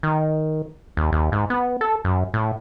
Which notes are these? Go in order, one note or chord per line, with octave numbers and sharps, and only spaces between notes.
D#3
D#2
D#2
G#2
B3
A4
F#2
A2